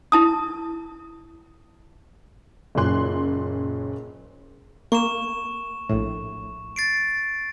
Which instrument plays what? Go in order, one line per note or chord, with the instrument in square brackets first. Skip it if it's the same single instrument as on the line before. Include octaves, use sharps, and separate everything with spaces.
[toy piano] E4 A5 D#6
[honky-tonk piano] F#1 F#2 A#2 C#4 C6 F#6
[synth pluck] A#3 [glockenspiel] C#6 E7
[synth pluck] A#1 A2
[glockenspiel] A6 C7 D7